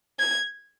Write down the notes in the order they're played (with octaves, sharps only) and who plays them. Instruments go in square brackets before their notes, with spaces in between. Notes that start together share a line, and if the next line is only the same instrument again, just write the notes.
[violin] G#6